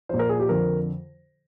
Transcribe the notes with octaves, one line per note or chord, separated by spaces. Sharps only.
A#2 F3 C5
A#4
G#4
G4
F2 D3 F3 A#4